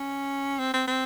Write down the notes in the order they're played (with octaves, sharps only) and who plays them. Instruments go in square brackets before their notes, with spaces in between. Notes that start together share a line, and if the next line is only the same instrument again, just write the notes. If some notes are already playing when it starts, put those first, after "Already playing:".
Already playing: [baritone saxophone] C#4
C4
C4
C4